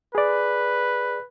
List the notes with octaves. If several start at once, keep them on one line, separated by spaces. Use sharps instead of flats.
G#4 B4 D5